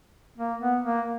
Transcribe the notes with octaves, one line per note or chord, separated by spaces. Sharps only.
A#3
B3
A#3